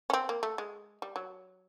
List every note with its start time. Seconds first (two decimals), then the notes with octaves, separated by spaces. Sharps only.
0.10 C#4
0.13 C4
0.29 A#3
0.43 A3
0.58 G#3
1.02 G3
1.16 F#3